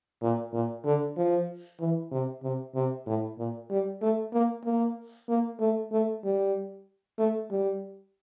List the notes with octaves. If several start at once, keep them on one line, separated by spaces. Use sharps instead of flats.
A#2
A#2
D3
F3
E3
C3
C3
C3
A2
A#2
G3
A3
A#3
A#3
A#3
A3
A3
G3
A3
G3